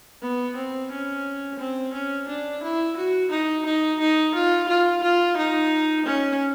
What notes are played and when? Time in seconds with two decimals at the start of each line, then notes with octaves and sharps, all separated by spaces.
0.22 B3
0.56 C4
0.91 C#4
1.59 C4
1.93 C#4
2.28 D4
2.62 E4
2.96 F#4
3.31 D#4
3.65 D#4
3.99 D#4
4.34 F4
4.68 F4
5.03 F4
5.37 D#4
6.06 C#4